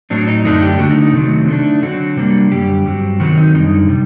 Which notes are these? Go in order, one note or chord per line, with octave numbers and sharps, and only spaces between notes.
A2 F#3 C4 D4
D#4
F#2 D3 A3 D4 D#4
G4
D3 A3 D4 F#4
D#4
D#4
C3 D#3 F#3 A3 C4
D3 A3 D4
D3 F#3 C4 F#4
C3 G3 A#3 D4
F#2 D3 G3 G4
G2 F#3 C4
C3 D#3 F#3 C4 F#4
D#4
F#2 D3 G3 D#4
C3 G3